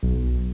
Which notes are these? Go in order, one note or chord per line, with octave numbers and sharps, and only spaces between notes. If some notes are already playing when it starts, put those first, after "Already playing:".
B1